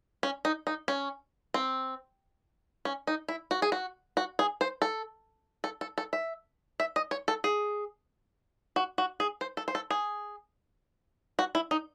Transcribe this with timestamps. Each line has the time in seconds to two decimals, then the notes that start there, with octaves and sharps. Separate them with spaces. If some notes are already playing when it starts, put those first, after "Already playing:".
0.23 C#4
0.45 D#4
0.67 D#4
0.88 C#4
1.54 C4
2.85 C#4
3.07 D#4
3.28 E4
3.51 F#4
3.62 G#4
3.72 F#4
4.17 F#4
4.39 G#4
4.61 C5
4.82 A4
5.64 A4
5.81 A4
5.98 A4
6.13 E5
6.80 E5
6.96 D#5
7.11 C#5
7.28 A4
7.44 G#4
8.76 F#4
8.98 F#4
9.20 G#4
9.41 C5
9.57 A4
9.68 C5
9.75 A4
9.90 G#4
11.39 F#4
11.55 E4
11.71 D#4